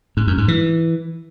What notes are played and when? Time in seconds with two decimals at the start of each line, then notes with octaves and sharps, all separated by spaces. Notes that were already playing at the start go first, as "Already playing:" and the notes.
0.17 G#2
0.27 F#2
0.38 G#2
0.48 E3